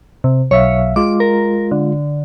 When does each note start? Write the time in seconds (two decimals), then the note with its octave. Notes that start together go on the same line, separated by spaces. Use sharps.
0.24 C3
0.51 B1 C#5 E5 F5
0.96 G#3 F4 D6
1.20 A#4
1.72 D3